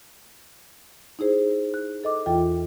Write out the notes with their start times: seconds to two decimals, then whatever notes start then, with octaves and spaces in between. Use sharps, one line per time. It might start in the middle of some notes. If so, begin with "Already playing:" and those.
1.19 D#4 E4 G#4 C5
1.74 F#6
2.04 A4 D#5 D6
2.26 E2 E3 F4 A4 G5